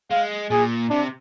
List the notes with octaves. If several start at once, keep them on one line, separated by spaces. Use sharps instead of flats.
G#3 F5
A#2 G#4
C3 D4